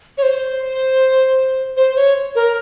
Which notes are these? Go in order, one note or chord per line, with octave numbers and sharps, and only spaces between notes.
C#5
C5
C5
C#5
A#4